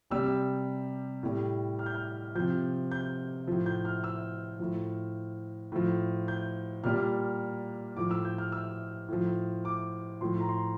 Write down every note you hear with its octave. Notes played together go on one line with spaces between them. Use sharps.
C3 G3 E6
A2 G3
F6
G6
F6
C3 F3 G6
G6
A2 F3
G6
F6
E6
A2 F3
A2 F3
G6
A#2 G3 F6
A2 F3 D6
E6
G6
F6
E6
A2 F3
D6
A2 F3 C6
A#5
C6